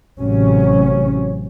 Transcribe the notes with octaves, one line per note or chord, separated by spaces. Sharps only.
A1 C3 F#3 C#4